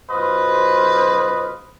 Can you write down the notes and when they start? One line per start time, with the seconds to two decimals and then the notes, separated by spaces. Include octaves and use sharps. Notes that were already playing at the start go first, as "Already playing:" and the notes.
0.11 B1 F#2 F4 B4 C5 D#5